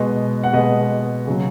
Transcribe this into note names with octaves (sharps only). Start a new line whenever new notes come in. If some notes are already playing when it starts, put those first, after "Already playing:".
Already playing: B2 G#3 B4 D#5
F#5
B2 G#3 B4 D#5
C#3 F#3